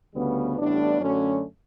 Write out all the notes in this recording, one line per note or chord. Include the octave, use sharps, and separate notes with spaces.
D2 C#3 G3 B3
A1 A2 G3 B3 D4
F#2 D3 F#3 A3 C#4